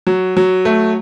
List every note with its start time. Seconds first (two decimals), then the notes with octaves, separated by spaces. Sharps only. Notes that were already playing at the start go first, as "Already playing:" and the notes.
0.07 F#3
0.37 F#3
0.65 A3